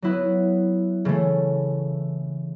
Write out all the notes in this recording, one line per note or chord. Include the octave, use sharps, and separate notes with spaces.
F#3 B3 E4 B4
C#3 E3 A3